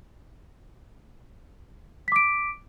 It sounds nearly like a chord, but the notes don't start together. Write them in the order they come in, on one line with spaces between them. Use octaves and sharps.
B6 D6 D7